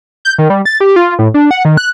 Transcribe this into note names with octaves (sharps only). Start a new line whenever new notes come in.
G6
D#3
G3
A6
G4
F4
A2
D4
F#5
D#3
F#6